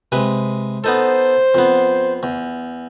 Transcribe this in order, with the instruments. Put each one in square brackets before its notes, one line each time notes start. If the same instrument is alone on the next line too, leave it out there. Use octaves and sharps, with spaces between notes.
[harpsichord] C3 G#3 B4
[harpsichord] B3 D#4 A4 [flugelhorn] C5
[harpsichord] F2 B3
E2